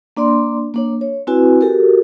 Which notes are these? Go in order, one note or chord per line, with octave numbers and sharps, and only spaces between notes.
A#3 D4 D5 C6
A#3 D4 C#5
C#5
C4 E4 F#4 B4 G#5
F#4 G4 A4 A#4